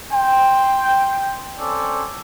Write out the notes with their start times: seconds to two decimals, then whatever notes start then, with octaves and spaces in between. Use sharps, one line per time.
0.12 G5 C6
1.60 C4 C#4 A4 D5